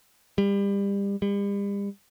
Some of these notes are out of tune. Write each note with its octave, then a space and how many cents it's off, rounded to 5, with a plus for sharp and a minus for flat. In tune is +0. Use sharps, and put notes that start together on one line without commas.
G3 +30
G3 +40